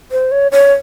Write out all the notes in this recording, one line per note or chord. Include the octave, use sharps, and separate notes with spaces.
C5
C#5
C#5